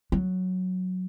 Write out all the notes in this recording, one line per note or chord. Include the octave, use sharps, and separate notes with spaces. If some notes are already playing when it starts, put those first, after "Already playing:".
F#3